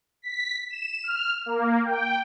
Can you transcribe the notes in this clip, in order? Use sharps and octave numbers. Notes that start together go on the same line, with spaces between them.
B6
E7
F6
A#3
G5